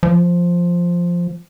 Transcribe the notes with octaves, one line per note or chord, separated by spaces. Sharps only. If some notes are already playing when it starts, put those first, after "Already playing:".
F3